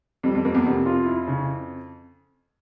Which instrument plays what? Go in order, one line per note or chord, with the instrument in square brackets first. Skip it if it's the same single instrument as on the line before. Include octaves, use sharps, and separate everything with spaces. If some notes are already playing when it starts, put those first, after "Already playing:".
[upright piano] F2 [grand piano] G3
[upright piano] F2
[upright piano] F2 [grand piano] A#3
[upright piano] E2
[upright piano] F2 [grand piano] C3
[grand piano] F4
E4
C#3